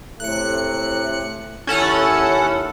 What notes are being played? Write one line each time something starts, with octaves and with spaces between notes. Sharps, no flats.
A2 C3 A3 F#6 C#7
D#2 C#4 E4 A4 F#5